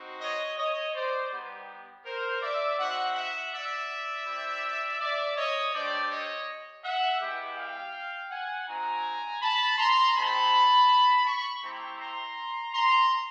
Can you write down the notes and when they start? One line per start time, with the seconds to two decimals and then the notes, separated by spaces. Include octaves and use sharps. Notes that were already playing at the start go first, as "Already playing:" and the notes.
Already playing: C4 D#4 F#4
0.20 C#5 D#5
0.57 C#5 D#5
0.93 C5 D5
1.31 G3 B3 D#4 G4
2.04 A#4 C5
2.41 D5 E5
2.78 C4 D#4 F#4 E5 F#5
3.15 E5 F#5
3.52 D5 E5
4.25 C4 E4 G4
4.99 D5 E5
5.36 C#5 D#5
5.73 A3 D4 G4 C5 D5
6.10 C#5 D#5
6.83 E5 F#5
7.20 G#3 B3 E4 G4
7.57 F5 G5
8.31 F#5 G#5
8.67 C4 D#4 F#4 G#5 A#5
9.41 A5 B5
9.78 A#5 C6
10.15 G#3 C4 D#4 A5 B5
11.25 B5 C#6
11.63 A3 C4 E4 G4 A#5 C6
11.99 A#5 C6
12.73 A#5 C6